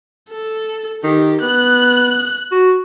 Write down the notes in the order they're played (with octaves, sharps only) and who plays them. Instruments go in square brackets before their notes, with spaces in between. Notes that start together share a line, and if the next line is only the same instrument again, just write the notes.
[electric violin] A4
[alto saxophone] D#3 [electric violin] G4
[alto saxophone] B3 [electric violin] F#6
[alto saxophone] F#4